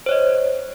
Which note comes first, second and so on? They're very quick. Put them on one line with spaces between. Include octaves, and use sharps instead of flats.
C5 C#5 D#5